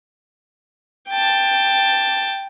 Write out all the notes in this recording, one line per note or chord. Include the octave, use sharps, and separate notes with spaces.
G5 A5